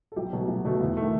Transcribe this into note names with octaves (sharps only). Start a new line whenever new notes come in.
A4
B1 G4
B2 F#3 A3
B1
B2 F#3 A3
E2
A3
D#3